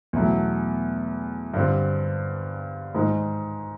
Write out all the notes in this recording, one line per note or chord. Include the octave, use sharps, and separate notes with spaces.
E2 B2 F#3 A3 C#4
G2 D3 G3 C4
G#2 D#3 G#3